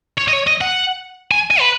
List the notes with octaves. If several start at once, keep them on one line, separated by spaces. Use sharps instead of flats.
C#5
D#5
C#5
D#5
F#5
G#5
G#5
B4